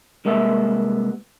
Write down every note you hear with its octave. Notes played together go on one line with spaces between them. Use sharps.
C2 G#3 A#3 B3 E5